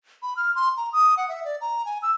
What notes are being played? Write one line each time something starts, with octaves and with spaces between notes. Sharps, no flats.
B5
F6
C6
A#5
D#6
F#5
E5
D5
A#5
G#5
E6